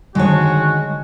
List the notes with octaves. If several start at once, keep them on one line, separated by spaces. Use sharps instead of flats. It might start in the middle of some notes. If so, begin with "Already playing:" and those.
D3 D#3 G#3 F#4 C#5 A5